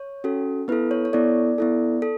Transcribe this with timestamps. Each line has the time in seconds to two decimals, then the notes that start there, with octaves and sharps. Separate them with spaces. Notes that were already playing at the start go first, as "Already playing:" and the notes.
Already playing: C#5
0.24 C#4 F#4 A4
0.68 B3 E4 A4 B4
0.91 C#5
1.05 C#5
1.13 B3 E4 A4 D5
1.58 B3 E4 A4
2.02 A4